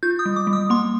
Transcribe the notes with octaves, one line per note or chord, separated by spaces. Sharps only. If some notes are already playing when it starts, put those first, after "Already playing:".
F4 G6
D#6
G3
D6
G3
D#6
A#3 C6